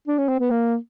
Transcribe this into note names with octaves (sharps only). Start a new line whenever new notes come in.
D4
C#4
C4
B3
A#3